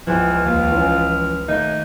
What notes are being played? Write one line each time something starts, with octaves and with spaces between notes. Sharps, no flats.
C#2 E3 F3 F6
D#2 F4
E3 C#4
D#3 A3 D#4